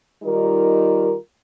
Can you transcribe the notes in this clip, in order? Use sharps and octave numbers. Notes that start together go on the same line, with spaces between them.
D#3 G3 D#4 F4 A#4